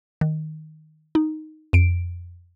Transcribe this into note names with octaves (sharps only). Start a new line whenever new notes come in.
D#3
D#4
F2 D7